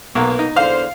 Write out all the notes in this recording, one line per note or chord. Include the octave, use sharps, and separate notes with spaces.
B1 A#3 B3
D#4
E2 D3 C5 F5